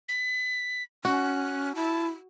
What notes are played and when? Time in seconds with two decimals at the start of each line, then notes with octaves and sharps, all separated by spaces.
0.09 B6
1.05 C#4 F#4 F#6
1.75 E4 A5